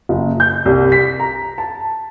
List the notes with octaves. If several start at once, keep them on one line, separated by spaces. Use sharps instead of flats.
F#1
G6
C2
B6
A#5
A5